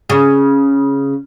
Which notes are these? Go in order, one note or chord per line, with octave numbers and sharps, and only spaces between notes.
C#3